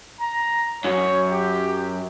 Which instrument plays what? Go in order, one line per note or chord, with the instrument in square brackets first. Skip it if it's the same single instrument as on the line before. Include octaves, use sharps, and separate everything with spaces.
[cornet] A#5
[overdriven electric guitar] F#2 [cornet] C#5
[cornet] G4